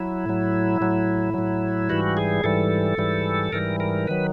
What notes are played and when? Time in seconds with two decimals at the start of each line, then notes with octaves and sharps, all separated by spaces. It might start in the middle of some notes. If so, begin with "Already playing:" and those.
Already playing: F#3 E4
0.26 A2 F#3
0.80 A2 F#3
1.34 A2 F#3
1.89 G#2 E3 G3 F#4
2.17 G#4
2.44 G#2 E3 G3 A4
2.98 G#2 E3 G3
3.52 G#2 E3 G3 A#4
3.80 A#4
4.07 D#3 F#3 B4